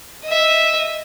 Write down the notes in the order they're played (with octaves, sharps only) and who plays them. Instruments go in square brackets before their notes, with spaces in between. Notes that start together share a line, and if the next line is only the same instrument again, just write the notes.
[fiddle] D#5 E5